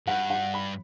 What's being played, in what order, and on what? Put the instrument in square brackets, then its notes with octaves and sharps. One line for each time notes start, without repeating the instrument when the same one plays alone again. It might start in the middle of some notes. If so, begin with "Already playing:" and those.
[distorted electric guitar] G2 [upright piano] F#5
[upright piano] F#5
B5